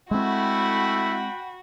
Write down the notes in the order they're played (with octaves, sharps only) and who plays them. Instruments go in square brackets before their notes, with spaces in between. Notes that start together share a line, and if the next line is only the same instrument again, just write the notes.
[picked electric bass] G#3 C4 [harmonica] A3 E4 [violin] F#4 [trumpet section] F#5 G5 B5